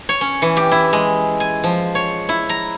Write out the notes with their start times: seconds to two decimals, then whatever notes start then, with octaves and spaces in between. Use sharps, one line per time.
0.09 C#5
0.21 C#4
0.42 E3
0.57 G4
0.72 E4
0.93 G#3
1.40 G#5
1.64 F3
1.95 C#5
2.29 E4
2.49 A#5